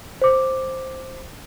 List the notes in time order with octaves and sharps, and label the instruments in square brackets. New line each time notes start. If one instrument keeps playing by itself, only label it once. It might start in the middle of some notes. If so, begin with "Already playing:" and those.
[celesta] C5 D6